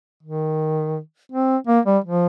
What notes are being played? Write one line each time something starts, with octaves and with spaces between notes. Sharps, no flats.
D#3
C4
A#3
G3
F3